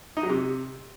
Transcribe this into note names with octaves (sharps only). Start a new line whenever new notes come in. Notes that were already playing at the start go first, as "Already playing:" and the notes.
D#4
F#3
C3